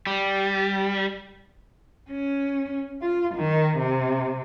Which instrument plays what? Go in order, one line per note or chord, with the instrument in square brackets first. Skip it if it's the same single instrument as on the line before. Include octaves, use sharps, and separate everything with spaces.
[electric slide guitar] G3
[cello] C#4
F4
D#3
C3